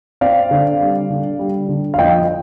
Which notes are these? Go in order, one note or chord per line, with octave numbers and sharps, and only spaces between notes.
C4 D5 F5
D3
G3
D3
G3
D3
F5
F2 D#5 G5